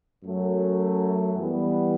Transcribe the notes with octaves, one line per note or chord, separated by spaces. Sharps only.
F#2 F#3 A3
E3 G3 B3